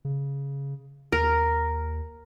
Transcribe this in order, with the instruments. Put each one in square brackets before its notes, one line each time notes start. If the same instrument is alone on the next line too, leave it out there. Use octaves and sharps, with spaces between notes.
[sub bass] C#3
[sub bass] D#2 [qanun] A#4